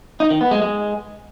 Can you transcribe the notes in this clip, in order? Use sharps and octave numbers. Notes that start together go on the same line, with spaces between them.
D#4
D#3
B3
G#3
G#3